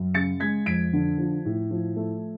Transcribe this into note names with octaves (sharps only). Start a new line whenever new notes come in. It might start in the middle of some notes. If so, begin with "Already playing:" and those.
Already playing: F#2
C#3 A6 C#7
G#3 G#6 B6
F2 B6 D7
D3
F3
A2
F3
A3